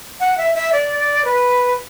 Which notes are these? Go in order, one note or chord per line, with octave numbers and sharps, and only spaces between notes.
F#5
E5
E5
D5
B4